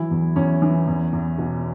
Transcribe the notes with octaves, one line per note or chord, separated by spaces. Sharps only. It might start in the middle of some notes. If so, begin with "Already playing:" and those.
Already playing: E3 F#3 E4
E2
E2 C#4
E3
E2
E2
B2